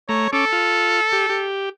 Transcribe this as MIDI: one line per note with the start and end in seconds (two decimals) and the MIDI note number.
0.09 0.28 57
0.09 0.30 73
0.09 0.28 82
0.33 0.45 61
0.33 1.47 69
0.33 0.45 86
0.53 1.01 65
1.12 1.26 67
1.29 1.69 67